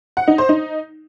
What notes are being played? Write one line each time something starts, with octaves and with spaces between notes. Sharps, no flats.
F#5
D#4
C5
D#4